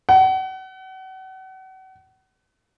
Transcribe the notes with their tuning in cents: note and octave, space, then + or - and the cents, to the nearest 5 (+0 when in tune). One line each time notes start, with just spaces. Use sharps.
F#5 +35